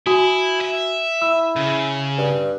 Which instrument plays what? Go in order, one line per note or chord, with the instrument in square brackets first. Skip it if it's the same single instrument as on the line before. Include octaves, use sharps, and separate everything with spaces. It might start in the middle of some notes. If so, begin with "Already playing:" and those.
[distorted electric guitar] E4 [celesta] F#4 G#5 D#6
[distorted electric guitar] E5
[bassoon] E4 [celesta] E6
[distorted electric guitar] C#3
[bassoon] G2